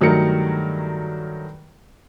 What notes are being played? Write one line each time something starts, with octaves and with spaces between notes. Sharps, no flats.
G2 D#3 F#3 A3 A#4 C#7